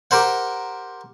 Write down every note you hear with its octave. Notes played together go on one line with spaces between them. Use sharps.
G4 A#4 C5 F#5